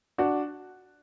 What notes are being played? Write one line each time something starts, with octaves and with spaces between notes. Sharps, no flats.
D4 F#4